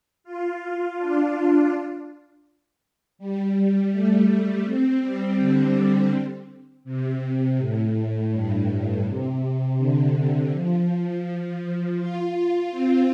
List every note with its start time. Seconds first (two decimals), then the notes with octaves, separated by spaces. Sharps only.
0.24 F4
0.98 D4
3.19 G3
3.91 A3
4.64 C4
5.02 G3
5.38 D3
6.84 C3
7.58 A2
8.32 G2
8.68 A2
9.04 C3
9.77 D3
10.52 F3
11.97 F4
12.71 C4